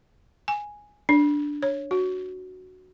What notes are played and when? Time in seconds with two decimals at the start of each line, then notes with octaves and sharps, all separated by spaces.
0.48 G#5
1.09 D4
1.63 C#5
1.91 F#4